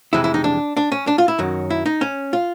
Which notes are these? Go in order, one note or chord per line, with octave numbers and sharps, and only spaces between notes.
F2 C3 E3 G#3 E4
E4
D#4
D4
D4
C#4
D4
F4
E4
F#2 D#3 F#3
E4
D#4
C#4
F4